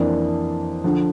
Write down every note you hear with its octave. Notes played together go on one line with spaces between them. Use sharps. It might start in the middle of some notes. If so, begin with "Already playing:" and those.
Already playing: F2 E3 A#3 D4
D3 F3